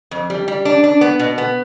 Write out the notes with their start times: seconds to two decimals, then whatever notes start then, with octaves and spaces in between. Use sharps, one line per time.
0.11 F2
0.30 G3
0.48 G3
0.65 D4
0.84 D4
1.01 B3
1.19 B2
1.38 B3